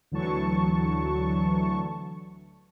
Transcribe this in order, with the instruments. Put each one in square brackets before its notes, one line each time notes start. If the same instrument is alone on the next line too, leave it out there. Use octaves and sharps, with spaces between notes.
[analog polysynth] D2 D3 E3 F#3 A5 C#6